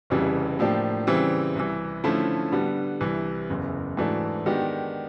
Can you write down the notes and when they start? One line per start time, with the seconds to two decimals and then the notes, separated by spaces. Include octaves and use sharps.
0.10 F1 F2 C#3 E3 G3
0.59 A2 F3 A#3 D4 G4
1.07 C#3 E3 G3 C4
1.56 C2 C3 E3
2.04 D3 F3 A3 C#4 E4
2.52 D3 G3 B3
3.00 C2 C3 E3
3.49 F#1 E2 C#3
3.97 G#2 E3 A3 D4 F#4
4.46 D#3 G#3 B3 D4 G4